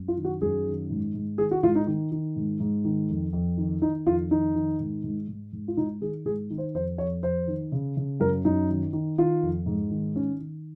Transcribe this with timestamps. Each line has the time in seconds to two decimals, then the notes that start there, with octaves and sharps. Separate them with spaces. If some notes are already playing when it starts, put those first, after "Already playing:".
Already playing: F#2
0.08 F4
0.17 D#3
0.25 F#4
0.41 F#2 G#4
0.66 D#3
0.90 G#2
1.14 G#2
1.38 D#3 G#4
1.51 F#4
1.63 G#2 F4
1.75 D#4
1.87 D#3
2.12 D#3
2.36 G#2
2.60 G#2
2.84 D#3
3.09 F2
3.33 F2
3.58 D#3
3.82 D#3 D#4
4.06 F2 F4
4.31 D#3 D#4
4.55 D#3
4.80 G#2
5.04 G#2
5.28 G#2
5.53 G#2
5.68 F4
5.77 G#2 D#4
6.01 D#3 G#4
6.25 G#2 G#4
6.50 D#3
6.58 C5
6.74 F2 C5
6.98 F2 C#5
7.23 F2 C5
7.48 D#3
7.72 C#3
7.97 C#3
8.20 F#2 A#4
8.45 F#2 D#4
8.70 D#3
8.93 D#3
9.18 D#3 F4
9.43 F2
9.66 G#2
9.91 D#3
10.15 D#3 C#4
10.40 D#3